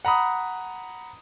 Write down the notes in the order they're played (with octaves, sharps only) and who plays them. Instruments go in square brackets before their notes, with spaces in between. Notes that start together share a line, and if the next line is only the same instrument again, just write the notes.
[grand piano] F#5 A#5 B5 D#6